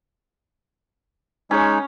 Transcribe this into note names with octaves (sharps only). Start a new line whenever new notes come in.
G#3 C#4 D#4 C#5